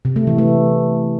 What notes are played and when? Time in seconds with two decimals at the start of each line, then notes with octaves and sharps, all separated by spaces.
0.05 C3
0.16 A3
0.27 E3
0.38 A3